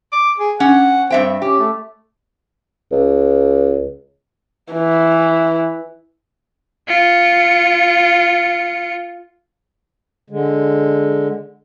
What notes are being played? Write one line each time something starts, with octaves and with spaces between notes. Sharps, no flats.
D6
G#4
C#4 F#5
G2 C4 E5 G5
C#4 G4
A3
C#2
E3
F4 C#7
D3 G#3